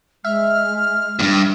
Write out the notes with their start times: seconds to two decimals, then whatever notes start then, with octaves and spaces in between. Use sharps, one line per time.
0.25 G#3 E5 F6
1.19 E2 G2